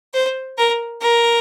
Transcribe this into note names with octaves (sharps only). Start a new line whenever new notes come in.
C5
A#4
A#4